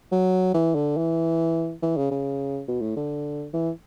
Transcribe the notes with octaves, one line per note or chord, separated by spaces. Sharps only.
F#3
E3
D3
E3
E3
C#3
C#3
B2
A2
D3
E3